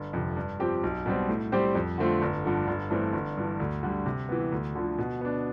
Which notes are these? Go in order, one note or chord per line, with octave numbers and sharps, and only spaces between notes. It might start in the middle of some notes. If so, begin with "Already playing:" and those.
Already playing: G1
F2 C3
G2
F3 C4 G4
B1
B2 G3 C4
A2
G3 C4 G4 C5
F2
D3 A3 C4 F4
G1
G2 D3 F3
G1
G2 E3 A3 C4
G1
G2 E3
D2
D3 G3
C3
E3 B3
D2
D3 F3
B2
B3 D4